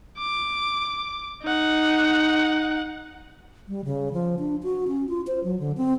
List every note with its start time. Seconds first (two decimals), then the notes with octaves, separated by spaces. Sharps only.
0.19 D6
1.43 D#4 F#5
3.68 G3
3.85 C#3
4.13 F3
4.39 D4
4.63 F#4
4.88 C#4
5.09 F4
5.27 C5
5.44 F#3
5.59 D3
5.77 C4